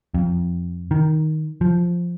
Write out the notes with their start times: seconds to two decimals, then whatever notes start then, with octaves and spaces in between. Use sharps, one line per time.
0.14 F2
0.91 D#3
1.61 F3